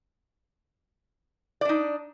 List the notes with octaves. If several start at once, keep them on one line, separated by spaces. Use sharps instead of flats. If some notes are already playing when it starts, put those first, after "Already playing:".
D4 D#4 D5